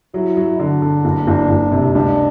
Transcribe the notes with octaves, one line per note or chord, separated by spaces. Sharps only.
F#3 E4
F#3
D3 D4
D3
F#1
F#1
F#1
C3
C#2 D4